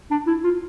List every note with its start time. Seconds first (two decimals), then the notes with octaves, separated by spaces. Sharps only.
0.11 D4
0.27 E4
0.44 F4